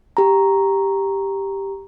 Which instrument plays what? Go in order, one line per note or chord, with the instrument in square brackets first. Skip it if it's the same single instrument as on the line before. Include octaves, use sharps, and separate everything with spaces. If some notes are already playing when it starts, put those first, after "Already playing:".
[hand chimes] G4 A#5